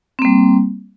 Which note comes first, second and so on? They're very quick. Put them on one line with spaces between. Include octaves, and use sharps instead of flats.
C4 A#3 G3